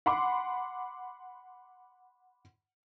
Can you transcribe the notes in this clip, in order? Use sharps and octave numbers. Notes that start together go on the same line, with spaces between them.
F#5 B5 C6 D6